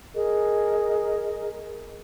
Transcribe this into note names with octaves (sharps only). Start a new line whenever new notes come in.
G#4 A#4 D#5